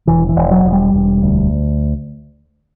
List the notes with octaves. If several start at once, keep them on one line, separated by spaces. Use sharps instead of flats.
E1 E3
E3
E1
F#3
E1
G3
E1
D2